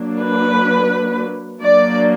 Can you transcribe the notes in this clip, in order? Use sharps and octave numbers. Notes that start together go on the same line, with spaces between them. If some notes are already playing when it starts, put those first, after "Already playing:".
Already playing: F#3 A#3 D4
B4
F#3 A#3 D4 D5